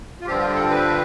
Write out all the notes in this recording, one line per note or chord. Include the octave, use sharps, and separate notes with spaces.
F4
G2 D3 F3 C4 G4
F4
A4
B4